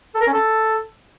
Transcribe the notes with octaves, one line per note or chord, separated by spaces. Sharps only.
A4
A#4
C#4
A4